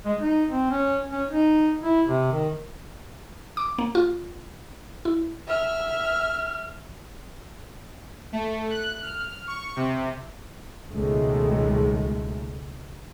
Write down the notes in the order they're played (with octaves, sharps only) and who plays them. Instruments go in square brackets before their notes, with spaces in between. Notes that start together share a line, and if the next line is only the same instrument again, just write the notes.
[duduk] G#3
D#4
C4
C#4
C#4
D#4
E4
C3
D#3
[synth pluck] D6
A#3
F4
E4
[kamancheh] E5 F6
[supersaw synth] A3
F#6
F6
C#6
C3
[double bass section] C#2 B2 D#3 G#3 A3